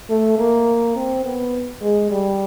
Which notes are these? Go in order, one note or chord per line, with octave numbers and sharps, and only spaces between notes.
A3
A#3
C4
B3
G#3
G3